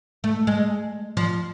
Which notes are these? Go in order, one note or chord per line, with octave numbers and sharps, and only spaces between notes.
A3
G#3
F3